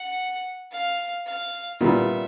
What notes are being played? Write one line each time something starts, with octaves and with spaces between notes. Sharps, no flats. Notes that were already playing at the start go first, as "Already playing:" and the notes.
Already playing: F#5
F5
F5
A#2 G3 B3 E5